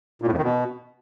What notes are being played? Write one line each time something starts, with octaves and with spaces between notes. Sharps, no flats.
A#2
A2
F2
D#3
B2